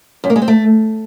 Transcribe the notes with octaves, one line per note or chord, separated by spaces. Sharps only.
F#2
A#3
G#3
C4
A3